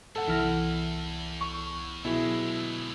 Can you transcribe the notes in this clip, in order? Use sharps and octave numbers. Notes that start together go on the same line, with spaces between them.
E2 G#2 A4 F#5
C2 E3 E4 F6 A#6
C#6
B2 D3 F#3 G#3 E4 G#4 E6